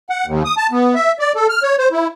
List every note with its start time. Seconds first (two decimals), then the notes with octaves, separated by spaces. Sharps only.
0.10 F#5
0.26 D#2
0.45 D#6
0.57 A5
0.72 B3
0.95 E5
1.19 D5
1.36 A4
1.49 F6
1.63 C#5
1.79 C5
1.92 E4